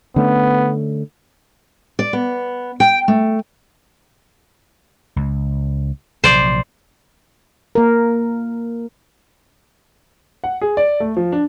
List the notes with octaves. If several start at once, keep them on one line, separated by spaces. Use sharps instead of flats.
D3 A3 B3 C#4
D5
B3
G5
A3
C#2
A#1 C3 F#3 C5 D5
A#3 A#4
F#5
G#4
D5
A3
F3
D4